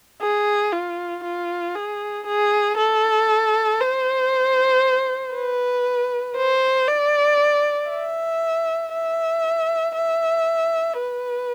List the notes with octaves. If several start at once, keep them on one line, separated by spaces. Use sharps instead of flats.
G#4
F4
F4
G#4
G#4
A4
C5
B4
C5
D5
E5
E5
E5
B4